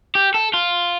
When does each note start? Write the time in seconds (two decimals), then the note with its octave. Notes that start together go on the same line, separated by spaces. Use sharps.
0.15 G4
0.34 A4
0.54 F4